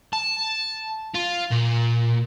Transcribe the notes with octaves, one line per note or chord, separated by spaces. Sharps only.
A5
F4
A#2